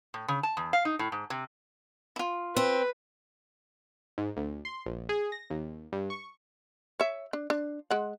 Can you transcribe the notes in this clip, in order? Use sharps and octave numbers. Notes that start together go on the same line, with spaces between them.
A2
C#3
A5
E2
F5
D#4
A2
G#2
C3
E4 F4
C4 B4
G#2
D2
C6
A#1
G#4
A#6
D#2
G2
C#6
C#5 E5
D4
D4
G#3 F#5